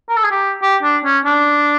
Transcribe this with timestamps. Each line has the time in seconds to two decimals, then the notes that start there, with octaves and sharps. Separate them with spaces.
0.09 A#4
0.17 A4
0.24 G#4
0.31 G4
0.62 G4
0.83 D4
1.05 C#4
1.25 D4